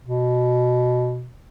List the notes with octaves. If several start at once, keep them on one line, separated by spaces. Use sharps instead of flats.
B2